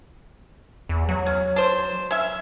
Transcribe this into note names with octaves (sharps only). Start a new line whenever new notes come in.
E2
F#3
C#4
D4 C5
C#4 E5